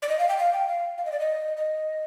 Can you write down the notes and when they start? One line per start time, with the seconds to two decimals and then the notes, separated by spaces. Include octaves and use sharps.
0.02 D5
0.09 D#5
0.19 F5
0.29 G5
0.38 F5
0.53 G5
0.68 F5
0.98 F5
1.05 D#5
1.12 D5
1.20 D#5
1.57 D#5